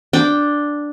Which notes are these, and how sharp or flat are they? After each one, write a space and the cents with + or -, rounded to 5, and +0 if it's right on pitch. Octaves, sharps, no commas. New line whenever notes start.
D4 +0 G5 +0